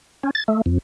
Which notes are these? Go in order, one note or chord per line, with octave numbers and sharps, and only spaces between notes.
C#4
A6
A3
F2